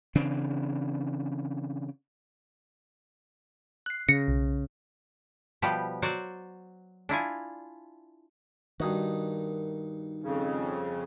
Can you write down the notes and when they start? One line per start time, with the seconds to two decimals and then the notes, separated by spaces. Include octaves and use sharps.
0.15 C#3 E3 C4 D4
3.86 F#6 C7
4.09 C#3 A#6 C#7
4.28 B1
5.62 B2 F3 G3 G4 B4
6.02 F#3 F#4 C5 D5
7.09 D4 E4 F4 G#5
8.80 G2 D#3 D#4 F#4
10.24 F2 C#3